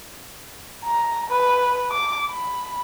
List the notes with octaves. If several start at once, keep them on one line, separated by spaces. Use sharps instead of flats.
A#5
B4
D6
B5